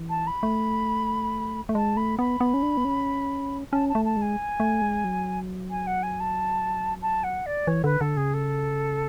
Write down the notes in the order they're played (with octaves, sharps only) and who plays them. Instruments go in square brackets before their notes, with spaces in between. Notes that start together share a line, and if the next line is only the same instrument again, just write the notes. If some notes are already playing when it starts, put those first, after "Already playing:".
Already playing: [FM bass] E3
[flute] A5
B5
[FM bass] A3
A3
[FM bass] G#3 [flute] A5
[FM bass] A3 [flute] B5
[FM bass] B3 [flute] B5
[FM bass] B3
C#4
D4
B3
C#4
[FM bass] C#4 [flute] A5
[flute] A5
[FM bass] A3
[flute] A5
[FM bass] G#3
[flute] G#5
[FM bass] A3
G#3
F#3
[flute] G#5
F#5
G#5
A5
A5
F#5
D5
[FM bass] E3 [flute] C#5
[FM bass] D3 [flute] B4
[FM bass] D3 [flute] A4
[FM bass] C#3 [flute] G#4
[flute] A4